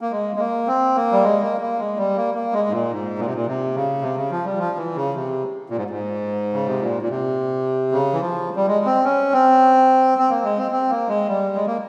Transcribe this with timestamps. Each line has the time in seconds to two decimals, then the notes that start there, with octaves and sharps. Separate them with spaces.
0.01 A#3
0.11 G#3
0.36 G#3
0.39 A#3
0.67 C4
0.95 A#3
1.12 G3
1.23 G#3
1.42 A#3
1.61 A#3
1.79 G#3
1.97 G3
2.16 A#3
2.35 A#3
2.53 G#3
2.68 G#2
2.72 A#2
2.91 G#2
3.19 A#2
3.26 C3
3.34 A#2
3.46 C3
3.75 C#3
4.02 C3
4.16 C#3
4.31 F3
4.44 G3
4.58 F3
4.77 E3
4.96 C#3
5.14 C3
5.70 A#2
5.77 G#2
5.90 G#2
6.53 C#3
6.67 C3
6.80 A#2
7.02 A#2
7.09 C3
7.92 C#3
8.13 E3
8.20 F3
8.56 G3
8.67 G#3
8.85 C4
9.04 C#4
9.33 C4
10.18 C4
10.30 A#3
10.44 G#3
10.58 C4
10.71 C4
10.89 A#3
11.08 G#3
11.28 G3
11.55 G#3
11.66 A#3